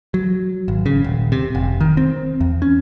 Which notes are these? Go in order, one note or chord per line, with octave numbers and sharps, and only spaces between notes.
F#3
G#1
C#3
D#1
C3
F1
D#3
C4
E2
C#4